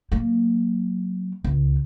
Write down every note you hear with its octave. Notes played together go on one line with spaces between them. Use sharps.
F#3 A#3
C#2